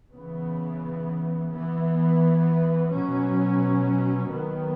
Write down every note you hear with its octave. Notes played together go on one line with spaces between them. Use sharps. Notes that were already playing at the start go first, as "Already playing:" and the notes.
C#3 E3 B3
E3 B3
B2 F#3 C#4
D#3 F#3 B3